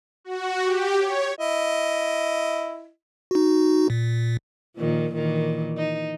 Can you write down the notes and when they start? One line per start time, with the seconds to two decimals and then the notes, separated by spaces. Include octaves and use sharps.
0.24 F#4
0.64 G4
0.99 C#5
1.39 E4 D#5
3.31 D#4 F#4
3.90 A#2
4.76 A#2 D#3 F3
5.13 A#2 D#3 E3
5.77 D#4